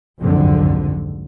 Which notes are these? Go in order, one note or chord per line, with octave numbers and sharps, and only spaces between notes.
F#1 C2 F2 G#2 D3